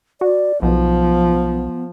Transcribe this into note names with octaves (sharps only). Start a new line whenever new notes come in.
F#4 D5
B1 F3 B3